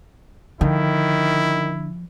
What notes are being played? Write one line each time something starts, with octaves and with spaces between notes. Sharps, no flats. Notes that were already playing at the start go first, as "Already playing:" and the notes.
D3 D#3 F3 E4 G5